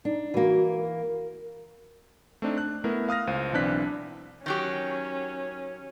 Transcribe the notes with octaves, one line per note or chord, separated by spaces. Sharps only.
D4 D#4
E3 A#3 F#4
A#4
A3 C4 D4 D#4
F#6
A3 B3 E4 A#4
F5 D#6 F6 A#6
C#2 C5 F5 D#7
B1 E3 C4 D4 F#6 B6
D#3 F#3 C#4 G4